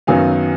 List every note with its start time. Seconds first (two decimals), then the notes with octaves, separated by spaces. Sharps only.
0.07 F#2 D#3 F#3 B3 F5 G#5